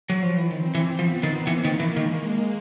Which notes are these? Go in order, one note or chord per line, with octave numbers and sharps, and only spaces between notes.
F#3
F3
E3
D#3 C4
E3
F3 B3
D#3
E3 A#3
D#3
E3
D#3 G#3